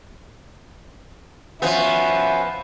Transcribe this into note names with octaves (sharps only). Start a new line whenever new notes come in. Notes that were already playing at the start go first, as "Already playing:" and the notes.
F3 B3 C#4 F#4 E5